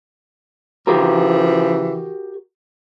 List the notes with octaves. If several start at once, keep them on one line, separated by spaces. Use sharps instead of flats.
C#3 E3 F3 F#4 G4 A#4